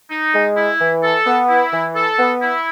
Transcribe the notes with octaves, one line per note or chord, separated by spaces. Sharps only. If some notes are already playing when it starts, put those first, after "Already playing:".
D#4
G#3
E4
E3
A4
B3
E4
E3
A4
B3
E4